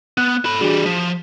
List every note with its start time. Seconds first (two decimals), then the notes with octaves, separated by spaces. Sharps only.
0.17 B3 F#6
0.45 A4 B5
0.61 E3 G3 D4 F#4 G#4
0.86 F3 B6